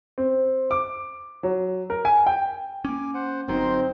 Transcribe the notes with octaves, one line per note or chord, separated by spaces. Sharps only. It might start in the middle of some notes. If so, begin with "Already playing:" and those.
C4
D6
F#3
A#4
G#5
G5
A#3 C#4 G#5 D6
C5 F#5
G1 F#3 C4 D#4 A#4 C5 C6